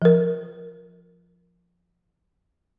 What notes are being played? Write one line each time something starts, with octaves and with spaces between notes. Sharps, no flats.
F3 A#4